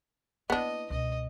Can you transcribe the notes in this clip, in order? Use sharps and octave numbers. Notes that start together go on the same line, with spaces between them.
A#3 B3 D4 E4 D#5
C#2 B2 D#5